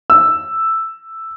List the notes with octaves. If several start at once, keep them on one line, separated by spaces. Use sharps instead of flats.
E6